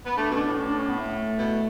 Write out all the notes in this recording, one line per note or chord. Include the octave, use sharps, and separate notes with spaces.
B3
A3 D4
B2 C#4
D4
A2
C#4
D4
C#4
B3
A3
B2